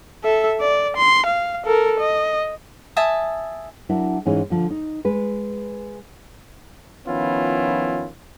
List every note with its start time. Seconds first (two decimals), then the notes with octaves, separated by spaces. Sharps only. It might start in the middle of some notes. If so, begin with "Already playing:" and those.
0.24 A4 E5
0.60 D5
0.97 C6
1.26 F5
1.66 A4 A#4
2.00 D#5
2.96 E5 G#5 A5 D#6
3.89 F#3 D4 E4 A#4 E5
4.26 G#2 E3 G#3 C#4 D#4
4.50 D3 F3 F4
4.70 D#4
5.05 G#3 B4
7.06 D#3 F3 B3 C#4 E4 F4